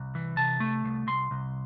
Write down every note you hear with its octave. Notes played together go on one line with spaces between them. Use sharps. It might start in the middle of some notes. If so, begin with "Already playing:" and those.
Already playing: C2
E3
C3 A5
A3
C2
C2 C6
C2